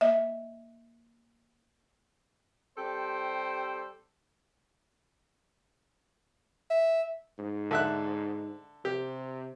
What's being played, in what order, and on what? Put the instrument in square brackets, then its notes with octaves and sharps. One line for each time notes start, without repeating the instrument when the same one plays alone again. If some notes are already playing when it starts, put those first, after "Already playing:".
[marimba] A#3 D#5 E5
[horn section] G3 C4 G4 A4 C5
[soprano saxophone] E5
[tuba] G#2
[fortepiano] D3 E5 F#6
[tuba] C3 [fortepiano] G4